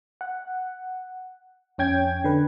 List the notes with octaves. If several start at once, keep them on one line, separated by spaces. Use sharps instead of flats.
F#5
F2 C#4 G5 G#6
D3 B4